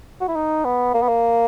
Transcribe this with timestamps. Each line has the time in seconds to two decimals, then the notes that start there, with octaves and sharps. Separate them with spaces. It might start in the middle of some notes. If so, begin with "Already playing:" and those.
0.21 F#4
0.28 E4
0.35 D#4
0.65 B3
0.94 A#3
1.02 B3
1.08 A#3